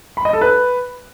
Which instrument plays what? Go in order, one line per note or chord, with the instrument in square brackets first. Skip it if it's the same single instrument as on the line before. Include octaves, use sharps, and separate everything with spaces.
[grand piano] B5
D#5
A4
B4